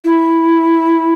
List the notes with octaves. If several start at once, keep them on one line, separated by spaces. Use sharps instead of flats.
E4